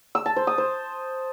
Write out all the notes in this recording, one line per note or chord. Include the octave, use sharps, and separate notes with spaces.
E6
A5
C5
D#6
C5